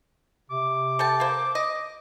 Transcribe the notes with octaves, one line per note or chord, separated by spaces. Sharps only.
C3 D6
A4 G5 A5
A#3 C5
D#5